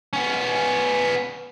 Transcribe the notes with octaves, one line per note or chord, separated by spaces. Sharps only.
B3 C#4